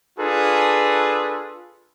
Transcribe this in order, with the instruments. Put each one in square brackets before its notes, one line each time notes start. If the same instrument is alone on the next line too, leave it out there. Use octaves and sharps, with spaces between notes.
[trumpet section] D4 F4 G#4 A4 B4